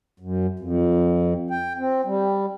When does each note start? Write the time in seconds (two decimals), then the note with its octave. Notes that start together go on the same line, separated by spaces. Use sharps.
0.20 F#2
0.59 F2
1.50 G5
1.77 C4
2.05 G3